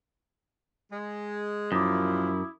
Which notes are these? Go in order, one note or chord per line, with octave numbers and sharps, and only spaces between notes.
G#3
F#2 A#2 F3 E4 D6 D#6